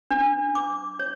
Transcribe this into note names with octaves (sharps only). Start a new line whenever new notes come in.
D4
D6
C#5